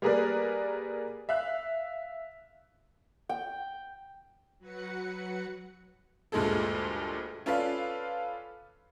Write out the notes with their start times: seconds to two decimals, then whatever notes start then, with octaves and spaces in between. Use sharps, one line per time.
0.02 G3 A#3 G#4 A#4 B4 D5
1.29 E5 F5 F#6
3.29 G5
4.59 F#3 F#4 B4 F#5 C#7
6.32 D2 G2 A#2 G#3 G#4 A4
7.46 C#4 F4 A4 B4 D5 F5